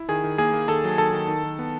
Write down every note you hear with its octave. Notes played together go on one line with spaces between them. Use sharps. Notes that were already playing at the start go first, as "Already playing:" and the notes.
Already playing: E4
D#3 G#4 G#5
D#3
A#3 G#4 G#5
A#3
D#3 A4 A5
F#3
D#3 A4 A5
D#3
D#3
D#3
B3